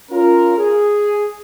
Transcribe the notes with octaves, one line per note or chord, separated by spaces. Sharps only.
C#4 F4 A#4
G#4